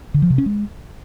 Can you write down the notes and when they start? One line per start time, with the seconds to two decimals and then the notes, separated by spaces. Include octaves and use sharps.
0.14 D3
0.22 F3
0.30 C3
0.38 C#4
0.46 G#3